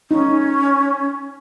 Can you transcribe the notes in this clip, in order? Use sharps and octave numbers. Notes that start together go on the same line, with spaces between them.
C#4 D#4